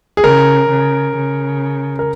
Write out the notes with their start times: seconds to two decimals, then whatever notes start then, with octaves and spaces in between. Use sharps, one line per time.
0.17 G#4
0.23 C#3 A#4
0.70 C#3
1.17 C#3
1.99 A#4